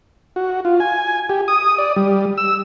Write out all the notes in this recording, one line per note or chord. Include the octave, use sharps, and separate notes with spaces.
F#4
F4
G#5
G4
D#6
D5
G3
E6